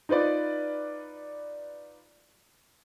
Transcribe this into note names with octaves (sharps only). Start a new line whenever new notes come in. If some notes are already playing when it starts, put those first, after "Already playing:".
D#4 F4 B4 D5